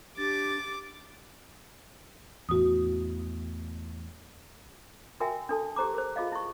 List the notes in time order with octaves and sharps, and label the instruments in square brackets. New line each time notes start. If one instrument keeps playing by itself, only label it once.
[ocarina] D4 [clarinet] G4 [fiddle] D6 [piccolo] A6
[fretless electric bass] E2 A2 E3 [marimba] F#4 D#6
[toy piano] F#4 A#4 E5 G5 G#5
D4 A4 A5
G4 C5 A#5 D6
A#4 C5
F4 G#4 D#5 F5
E4 C#6